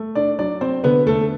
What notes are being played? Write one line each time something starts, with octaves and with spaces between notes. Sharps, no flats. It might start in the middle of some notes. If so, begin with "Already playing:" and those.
Already playing: A3
D4 D5
F#3 D4 D5
C4 C5
D3 B3 B4
A3 A4